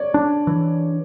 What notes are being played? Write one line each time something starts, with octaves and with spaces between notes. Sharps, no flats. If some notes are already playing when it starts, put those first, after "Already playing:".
Already playing: C#5 D5
D4
E3